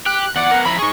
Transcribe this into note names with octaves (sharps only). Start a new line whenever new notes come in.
G4 F#6
E2 D5 F#5
B3 A#4
F3 E4 A#5 B5
D#4 G#4 C#6